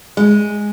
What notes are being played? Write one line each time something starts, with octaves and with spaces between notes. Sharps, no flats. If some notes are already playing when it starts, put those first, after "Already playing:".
G#3